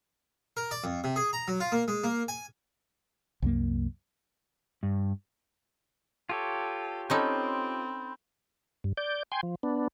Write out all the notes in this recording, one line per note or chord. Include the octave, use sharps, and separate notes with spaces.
A#4
D5
F2
C3
G#4
A#5
F#3
F4
A#3
G#3
A#3
G#5
C2 F#2 A#3
G2
F4 G4 A4 C#5
C4 C#4 D#4 A4 B5 C6 G6
G2
D5 G6
G5 G#5 C6
F3
B3 D4